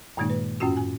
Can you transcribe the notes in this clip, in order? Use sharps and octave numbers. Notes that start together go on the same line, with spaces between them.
G2 A#2 D#3 G#3 A#3 D#4
B4
F#2 A2 C#4 F4 F#4
G#5